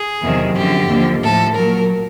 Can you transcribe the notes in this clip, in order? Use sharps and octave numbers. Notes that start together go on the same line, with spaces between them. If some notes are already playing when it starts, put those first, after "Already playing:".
Already playing: G#4
E2 C3 D#3 F#3
F#2 D3 F3 G4
D#2 D3 F3
A2 F3 A4
A#2 F#3 A#4